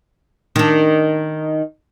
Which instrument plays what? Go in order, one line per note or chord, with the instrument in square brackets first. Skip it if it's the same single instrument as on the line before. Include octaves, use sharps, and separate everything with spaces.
[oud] D#3 D4